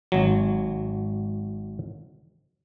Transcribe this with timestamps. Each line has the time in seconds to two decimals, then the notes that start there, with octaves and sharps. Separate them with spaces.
0.12 G#1 F#3